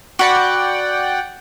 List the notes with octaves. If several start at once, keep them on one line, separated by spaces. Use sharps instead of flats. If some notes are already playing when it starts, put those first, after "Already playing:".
F#4 D5 F#5 G5 B5